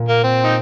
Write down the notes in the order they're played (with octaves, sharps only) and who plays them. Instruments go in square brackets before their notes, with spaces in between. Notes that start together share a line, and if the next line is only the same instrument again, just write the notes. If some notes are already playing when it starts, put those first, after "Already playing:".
Already playing: [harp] A#2
[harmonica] A#3
C4
D#4